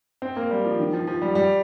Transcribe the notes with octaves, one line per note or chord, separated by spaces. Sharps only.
C4
A#3
G3
F3
D#3
F3
F3
G3
G3